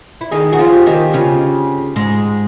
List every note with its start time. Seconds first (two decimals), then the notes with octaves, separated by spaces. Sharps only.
0.21 E4
0.31 D#3 D#4 G#4
0.52 F#4 G#4
0.59 F3 F4
0.73 G4
0.86 D#3 D#4
0.93 G4
1.14 C#3 C#4 F4
1.96 G#2 G#3